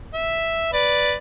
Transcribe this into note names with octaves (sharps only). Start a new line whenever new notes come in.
E5
B4 D5